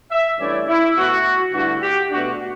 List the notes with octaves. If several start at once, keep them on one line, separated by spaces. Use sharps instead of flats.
E5
G2 E3 A3 C#4 E4 D5
E4
B2 A3 E4 F#4
G2 D3 A3 E4 F#4
G4
B2 A3 D4 F#4